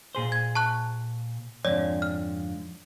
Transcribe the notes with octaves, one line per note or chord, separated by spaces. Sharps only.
A#2 G#4 C5
G#6
A5 C#6 F#6
F2 G#2 D3 C#5 D5
F6